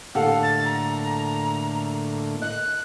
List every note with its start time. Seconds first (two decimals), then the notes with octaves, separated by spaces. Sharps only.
0.15 A2 D3 A#3 G4 A4 F5 F#5
0.43 A6
0.65 A#5
2.42 D#5 F#6